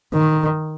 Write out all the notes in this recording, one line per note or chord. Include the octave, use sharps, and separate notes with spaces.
D#3